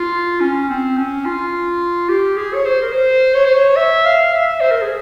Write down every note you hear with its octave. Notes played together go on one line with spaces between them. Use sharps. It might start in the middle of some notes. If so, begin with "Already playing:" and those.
Already playing: F4
C#4
C4
C#4
F4
G4
G#4
C#5
C5
A#4
C5
C#5
C5
C#5
E5
F5
E5
C5
A#4
G#4